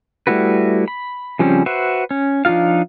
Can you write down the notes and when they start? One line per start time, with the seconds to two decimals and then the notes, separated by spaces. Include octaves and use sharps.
0.27 G3 A3 E4 F#4 B4
0.88 B5
1.39 C#3 F3 G3 C4 C#4
1.66 F#4 B4 C5 E5
2.11 C#4
2.45 F3 D4 D#4 F4 F5